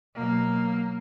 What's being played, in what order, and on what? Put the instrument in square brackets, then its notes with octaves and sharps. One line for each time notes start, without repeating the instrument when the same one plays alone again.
[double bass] B2 F#3 [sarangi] A#3